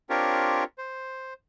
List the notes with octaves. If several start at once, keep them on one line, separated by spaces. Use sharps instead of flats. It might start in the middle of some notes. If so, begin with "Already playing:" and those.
C4 D4 F4 G4 A#4 C#5
C5